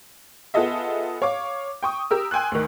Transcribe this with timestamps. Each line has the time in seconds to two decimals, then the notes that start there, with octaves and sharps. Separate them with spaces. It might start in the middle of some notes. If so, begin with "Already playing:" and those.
0.54 B3 F4 G#4 A4 D#5 E5
1.22 C#5 F5 D6
1.83 G5 C#6 D#6
2.11 G4 A#4 E6
2.31 G5 G#5 C6 F#6
2.52 D2 D#3